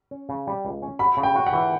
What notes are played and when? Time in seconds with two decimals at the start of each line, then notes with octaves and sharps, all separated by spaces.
0.11 C#4
0.29 C#3
0.47 G3
0.65 C#2
0.82 C#4
0.99 F#4 B5
1.17 C#3
1.23 G5
1.36 F#4
1.46 F#5
1.53 E3